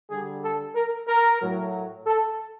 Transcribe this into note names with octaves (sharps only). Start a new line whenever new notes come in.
D3 G3 G#4
A4
A#4
A#4
A2 F#3
A4